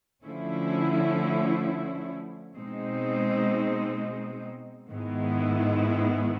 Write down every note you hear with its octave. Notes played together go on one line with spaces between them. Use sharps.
D3 F3 A3 C#4 E4
B2 G#3 C4 D#4
G#2 D#3 G#3 B3 E4